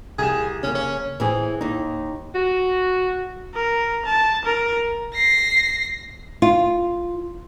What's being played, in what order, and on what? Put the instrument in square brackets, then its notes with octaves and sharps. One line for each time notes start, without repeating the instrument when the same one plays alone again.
[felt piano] C2 G4 E7 [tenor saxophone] G#4
[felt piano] C#3 A#3 [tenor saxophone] C#4
[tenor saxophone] C#4
[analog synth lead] A2 [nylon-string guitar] E3 C4 G#4
[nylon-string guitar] D#2 D#4
[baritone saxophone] F#4
[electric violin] A#4
A5
A#4
[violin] A#6 C7
[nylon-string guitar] F4